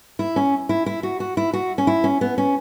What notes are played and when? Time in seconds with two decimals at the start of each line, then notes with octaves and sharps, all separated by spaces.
0.19 E4
0.36 C#4
0.69 E4
0.86 E4
1.03 F#4
1.20 F#4
1.37 E4
1.53 F#4
1.78 C#4
1.87 E4
2.04 C#4
2.21 B3
2.38 C#4